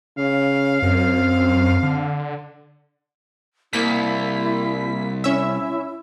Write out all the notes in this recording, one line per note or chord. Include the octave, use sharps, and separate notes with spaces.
C#3 F5
F#2 C4
D3
C2 A#3 E4 B6
C#4 E4 E5